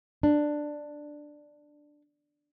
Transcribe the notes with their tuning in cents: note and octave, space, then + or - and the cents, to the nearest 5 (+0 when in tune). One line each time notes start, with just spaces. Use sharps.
D4 +10